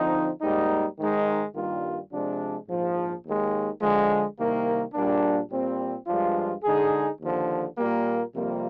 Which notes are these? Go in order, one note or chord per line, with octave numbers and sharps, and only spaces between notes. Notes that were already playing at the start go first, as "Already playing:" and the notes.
Already playing: D3 F3 C4 D#4
G#2 G3 A#3 D#4
G#2 D#3 G#3 D#4
G2 D#3 G3 A#3 F4
C3 F3 G#3 D4
A#1 G#2 F3
D#2 D#3 G#3
D3 F3 G#3
C2 C3 D#3 A#3
A#1 A#2 G3 A#3 D4
A#2 G3 C4
G2 F3 G#3 D4 F4
D3 G#3 D#4 G#4
D#2 D3 F3
A#2 G3 A#3
F2 C3 G3 A#3 F4